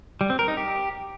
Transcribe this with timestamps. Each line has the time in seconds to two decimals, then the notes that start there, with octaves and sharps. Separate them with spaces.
0.21 G3
0.30 C4
0.39 A#4
0.48 D#4
0.57 G4